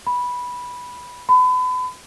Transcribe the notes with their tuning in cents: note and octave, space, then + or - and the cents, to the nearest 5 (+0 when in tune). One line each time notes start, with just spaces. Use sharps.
B5 -10
B5 +35